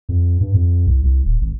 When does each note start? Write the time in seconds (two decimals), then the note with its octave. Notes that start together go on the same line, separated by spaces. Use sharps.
0.09 F2
0.41 G2
0.54 F2
0.87 C2
1.03 C2
1.25 D#1
1.41 G#1